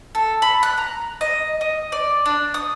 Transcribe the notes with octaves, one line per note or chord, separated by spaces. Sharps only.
A4
B5
F#6
A#5
D#5
D#5
D5
D4
D#6